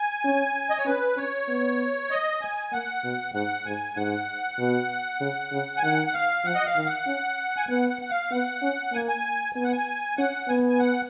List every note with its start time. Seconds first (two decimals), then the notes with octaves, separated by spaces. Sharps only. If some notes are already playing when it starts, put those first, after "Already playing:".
Already playing: G#5
0.25 C#4
0.70 D#5
0.78 C#5
0.86 C#4 B4
1.17 C#4 C#5
1.48 B3
2.11 D#5
2.41 G#5
2.73 A#3 F#5
3.04 B2
3.35 G#2 F#5
3.65 G#2 G#5
3.96 G#2 F#5
4.59 B2
5.21 C#3
5.52 C#3
5.77 G#5
5.83 D#3 F#5
6.07 F#5
6.14 F5
6.45 F3 F#5
6.55 D#5
6.66 F5
6.76 D#3
6.86 F#5
7.07 C#4
7.57 G#5
7.69 B3 F#5
7.90 F#5
8.02 F#5
8.11 F5
8.31 B3 F#5
8.63 C#4
8.93 A#3 G#5
9.08 G#5
9.55 B3 G#5
9.64 F#5
9.72 G#5
10.18 C#4 F#5
10.48 B3 G#5
10.70 G#5
10.80 F#5